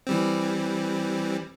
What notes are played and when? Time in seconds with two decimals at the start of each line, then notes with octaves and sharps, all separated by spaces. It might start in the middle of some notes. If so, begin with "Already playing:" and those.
0.07 E3 G3 C4